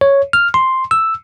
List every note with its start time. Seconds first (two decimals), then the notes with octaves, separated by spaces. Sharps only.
0.01 C#5
0.33 F6
0.54 C6
0.91 E6